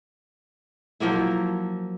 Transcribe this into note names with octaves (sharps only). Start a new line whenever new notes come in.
F3 F#3 A#3 E4